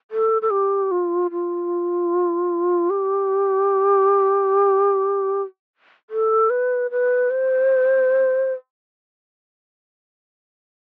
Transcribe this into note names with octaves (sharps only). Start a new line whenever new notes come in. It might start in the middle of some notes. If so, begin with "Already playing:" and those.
A4
A4
G4
F4
F4
G4
A4
B4
B4
C5